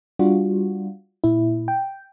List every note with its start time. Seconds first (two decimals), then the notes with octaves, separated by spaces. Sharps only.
0.19 G3 D4 F4 F#4
1.24 A#2 E4
1.68 G5